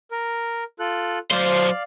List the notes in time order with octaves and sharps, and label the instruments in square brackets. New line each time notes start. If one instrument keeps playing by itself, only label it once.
[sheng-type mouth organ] A#4
F4 A4 F#6
[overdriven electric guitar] F#3 C5 [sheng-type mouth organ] D5 F5